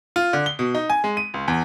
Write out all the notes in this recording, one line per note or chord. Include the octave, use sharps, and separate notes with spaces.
F4
D3
G7
B2
D#4
G#5
G#3
D#7
C#2
E2